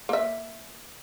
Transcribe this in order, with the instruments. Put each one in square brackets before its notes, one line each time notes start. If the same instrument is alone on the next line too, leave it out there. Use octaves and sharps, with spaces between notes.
[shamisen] A#3 E5